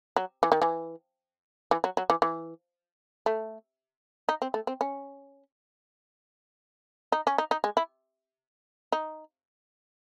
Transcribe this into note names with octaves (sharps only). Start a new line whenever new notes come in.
F#3
E3
D#3
E3
E3
F#3
F#3
E3
E3
A3
D#4
C4
A3
C4
C#4
D#4
C#4
D#4
D#4
G#3
E4
D#4